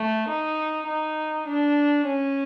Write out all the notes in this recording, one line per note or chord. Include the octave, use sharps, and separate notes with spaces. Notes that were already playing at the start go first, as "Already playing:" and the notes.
Already playing: A3
D#4
D#4
D4
C#4